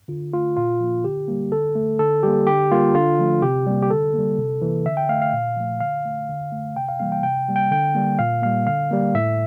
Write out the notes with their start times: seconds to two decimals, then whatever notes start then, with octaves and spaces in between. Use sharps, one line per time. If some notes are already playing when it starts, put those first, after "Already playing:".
0.08 D3 F4
0.33 A3 F4
0.57 A#2 F4
0.80 F3 A#3
1.04 D3 G4
1.28 G3 A#3
1.52 D3 A4
1.75 A3
1.99 D3 A4
2.23 G3 A#3 G4
2.47 D3 G4
2.71 G3 A#3 F4
2.94 D3 F4
3.19 F3 A3
3.42 C3 G4
3.67 G3 A#3
3.83 G4
3.90 D3 A4
4.14 G3 A#3
4.38 C3
4.62 E3 A#3
4.86 D3 E5
4.97 G5
5.09 A3 F5
5.22 F5
5.33 A#2
5.56 F3 A3
5.80 D3 F5
6.05 A3
6.29 D3
6.52 A3
6.75 C3 G5
6.88 F5
6.99 E3 G3 A#3 F5
7.12 G5
7.23 C3 G5
7.48 G3 A#3
7.56 G5
7.71 D3 G5
7.95 G3 A#3
8.19 A#2 F5
8.42 G3 A#3 F5
8.67 D3 F5
8.91 G3 A#3
9.14 A2 E5